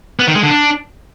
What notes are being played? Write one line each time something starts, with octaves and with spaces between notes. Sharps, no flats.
B3
D#3
G#3
D3
D4